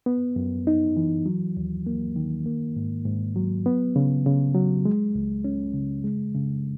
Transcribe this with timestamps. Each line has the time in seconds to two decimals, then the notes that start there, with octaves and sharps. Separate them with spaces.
0.06 B3
0.36 F#2
0.67 D#4
0.97 E3
1.26 F#3
1.57 D#2
1.87 A#3
2.16 D#3
2.46 A#3
2.76 G#2
3.05 G#2
3.36 F#3
3.66 B3
3.96 C#3
4.26 C#3
4.55 F#3
4.85 G#3
5.15 C#2
5.44 C#4
5.74 C#3
6.04 G#3
6.34 C#3